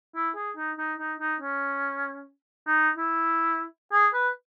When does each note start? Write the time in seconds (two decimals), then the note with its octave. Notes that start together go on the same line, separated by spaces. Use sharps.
0.15 E4
0.36 G#4
0.57 D#4
0.78 D#4
0.98 D#4
1.20 D#4
1.40 C#4
2.67 D#4
2.97 E4
3.92 G#4
4.14 B4